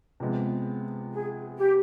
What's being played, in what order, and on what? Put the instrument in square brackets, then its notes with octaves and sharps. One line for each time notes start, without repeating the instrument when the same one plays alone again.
[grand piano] C3 F3 G#3 B3
[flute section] G#4
G4